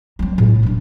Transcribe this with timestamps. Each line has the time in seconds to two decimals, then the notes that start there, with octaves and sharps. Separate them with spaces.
0.19 F#3 C4
0.38 A2 C3
0.63 D1 D4